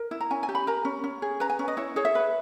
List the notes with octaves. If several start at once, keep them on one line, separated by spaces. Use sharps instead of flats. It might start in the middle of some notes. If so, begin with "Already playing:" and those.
Already playing: A#4
E4
A#5
C#4 G#5
G#5
G4
B5
A#4 A#5
C#4
C#4
G#4
B4 A#5
G#5
C#4
D#5
E4 C#5
G#4 C#5
E5
B4